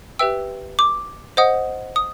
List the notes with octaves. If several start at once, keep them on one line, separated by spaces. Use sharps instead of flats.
G4 B4 E5 G5 E6
D6
C5 D#5 F#5 D#6
D#6